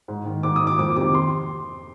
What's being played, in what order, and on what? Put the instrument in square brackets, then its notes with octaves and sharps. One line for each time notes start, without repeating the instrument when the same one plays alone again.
[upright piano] G#2
D#3
G#2 D6
D#6
D#3
D6
F2 D6
C3 D#3 D6
C6